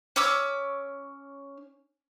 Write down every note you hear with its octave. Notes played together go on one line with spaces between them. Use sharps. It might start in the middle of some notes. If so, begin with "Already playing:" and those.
C#4 C#6 D6 E6